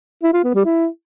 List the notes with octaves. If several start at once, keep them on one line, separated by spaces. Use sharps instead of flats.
E4
F4
B3
G3
E4